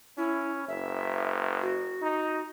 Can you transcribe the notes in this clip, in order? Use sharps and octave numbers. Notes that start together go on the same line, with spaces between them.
C#4 E4
F#1 E5
F#4
D#4